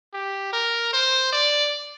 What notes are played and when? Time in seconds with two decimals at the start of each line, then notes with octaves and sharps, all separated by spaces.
0.13 G4
0.53 A#4
0.93 C5
1.32 D5